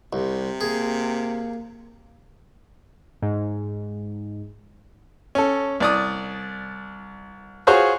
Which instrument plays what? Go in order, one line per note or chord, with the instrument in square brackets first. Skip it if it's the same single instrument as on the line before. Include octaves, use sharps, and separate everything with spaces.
[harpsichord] C2 [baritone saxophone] C3
[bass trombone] A#3 [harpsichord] G#4
[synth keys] G#2
[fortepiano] C#4 A4
C2 D5 D#6
F4 F#4 G#4 C5 C#5